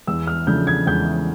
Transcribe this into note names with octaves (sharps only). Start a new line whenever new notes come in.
E2 E6
F6
C#3 F3 A3 D4 G6
G#6
E2 G6